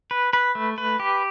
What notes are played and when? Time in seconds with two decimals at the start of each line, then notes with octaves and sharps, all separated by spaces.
0.11 B4
0.33 B4
0.55 A3
0.78 B4
1.00 G4